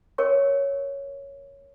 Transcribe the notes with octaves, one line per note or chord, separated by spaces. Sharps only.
A#4 C#5 G5 C#6